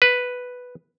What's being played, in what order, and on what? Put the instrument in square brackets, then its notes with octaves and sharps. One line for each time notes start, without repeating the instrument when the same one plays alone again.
[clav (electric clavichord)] B4